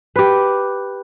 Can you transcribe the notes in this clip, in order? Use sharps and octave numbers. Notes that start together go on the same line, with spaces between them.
G4 B4